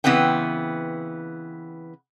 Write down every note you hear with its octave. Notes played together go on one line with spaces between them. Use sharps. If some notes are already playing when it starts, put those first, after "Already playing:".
C#3 E3 B3 C4 B4 G5